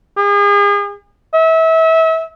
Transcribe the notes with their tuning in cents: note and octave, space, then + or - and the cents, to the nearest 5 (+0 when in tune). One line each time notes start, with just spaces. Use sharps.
G#4 -40
E5 -30